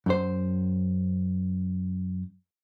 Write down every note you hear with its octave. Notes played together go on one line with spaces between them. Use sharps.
F#2 C5